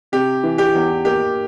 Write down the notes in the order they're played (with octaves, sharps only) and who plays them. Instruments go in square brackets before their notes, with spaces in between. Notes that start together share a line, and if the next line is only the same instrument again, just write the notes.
[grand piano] C3 [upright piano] G4
[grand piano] E3
[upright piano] G4
[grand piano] E2
[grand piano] A#3 [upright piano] G4